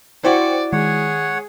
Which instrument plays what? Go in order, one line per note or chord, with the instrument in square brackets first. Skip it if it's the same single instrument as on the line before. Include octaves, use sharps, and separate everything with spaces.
[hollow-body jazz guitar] E4 F#4 [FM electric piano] C5 G5 C#7 [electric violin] D5
[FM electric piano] D#3 G#3 [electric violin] G#4 [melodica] C#5 F#5